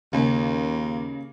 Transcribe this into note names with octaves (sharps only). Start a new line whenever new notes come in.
D#2 C#3 A#3